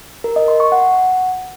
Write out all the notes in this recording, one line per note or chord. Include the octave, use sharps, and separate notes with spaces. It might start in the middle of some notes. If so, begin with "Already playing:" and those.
A#4
D#5
C6
C#6
F#5